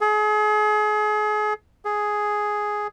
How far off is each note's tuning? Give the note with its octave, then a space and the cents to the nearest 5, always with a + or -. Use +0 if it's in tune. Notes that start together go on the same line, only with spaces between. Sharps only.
G#4 +35
G#4 +5